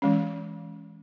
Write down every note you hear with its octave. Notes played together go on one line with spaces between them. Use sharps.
E3 G#3 C#4